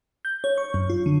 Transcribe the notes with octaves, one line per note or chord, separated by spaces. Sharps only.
G6
C#5
C#6
F#2
F4
D3